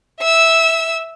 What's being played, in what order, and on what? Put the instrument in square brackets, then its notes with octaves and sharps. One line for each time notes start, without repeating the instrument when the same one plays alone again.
[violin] E5 E6